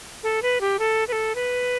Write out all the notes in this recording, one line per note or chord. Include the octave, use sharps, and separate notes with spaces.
A4
B4
G4
A4
B4
A4
B4